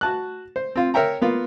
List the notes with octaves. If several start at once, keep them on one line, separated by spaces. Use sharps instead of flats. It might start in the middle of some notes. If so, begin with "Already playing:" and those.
F#4 A5 F#6
C5
C4 F4
A#4 C#5 E5 G5 A#5
A#3 B3 F4